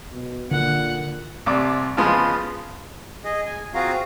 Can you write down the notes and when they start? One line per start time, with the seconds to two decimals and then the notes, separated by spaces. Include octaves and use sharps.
0.12 B2
0.51 A#2 D3 F#5
1.46 C2 C3 D5 D6
1.97 C#3 F3 G#3 B3 F4
3.24 G#4 D#5
3.46 G#5
3.74 C4 F4 F#4 G#4 F5 A#5